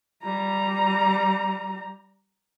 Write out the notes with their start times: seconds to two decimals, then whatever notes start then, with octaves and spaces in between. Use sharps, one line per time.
0.24 G3 A#5